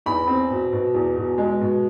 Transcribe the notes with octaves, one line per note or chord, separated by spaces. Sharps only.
E2 B5
C4
B2
B2
E2
B2
G#3
B2